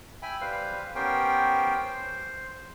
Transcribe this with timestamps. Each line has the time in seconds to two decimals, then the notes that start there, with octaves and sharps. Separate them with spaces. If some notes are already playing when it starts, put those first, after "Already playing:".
0.23 E5 G5 G#5 B5
0.41 G3 B4 C5 F5
0.95 B3 C#4 G4 A#4 C5 G5
1.85 C5